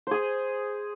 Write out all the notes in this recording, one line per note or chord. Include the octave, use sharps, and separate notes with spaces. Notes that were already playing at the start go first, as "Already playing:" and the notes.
G#4 C5